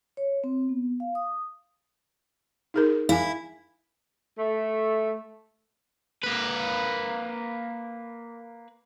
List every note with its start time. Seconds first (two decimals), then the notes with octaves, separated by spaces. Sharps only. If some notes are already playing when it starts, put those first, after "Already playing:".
0.17 C#5
0.44 C4
0.69 B3
1.00 F5
1.15 D#6
2.74 D#4 G#4 A#4
3.09 E4 F5 G#5
4.37 A3
6.23 A#3 B4